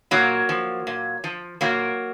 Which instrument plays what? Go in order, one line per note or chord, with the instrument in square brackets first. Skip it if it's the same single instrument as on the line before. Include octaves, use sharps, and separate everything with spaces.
[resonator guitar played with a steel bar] A#2 F#3 A#3
F3
A#2
F3
A#2 F#3 A#3